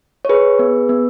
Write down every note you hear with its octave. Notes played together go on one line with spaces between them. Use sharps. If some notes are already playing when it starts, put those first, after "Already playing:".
C#5
G#4 B4
B3
B3